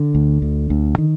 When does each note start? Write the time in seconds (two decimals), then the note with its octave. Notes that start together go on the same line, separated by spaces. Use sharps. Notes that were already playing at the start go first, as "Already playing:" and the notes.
Already playing: D3
0.15 D2
0.42 D2
0.70 D2
0.98 D#3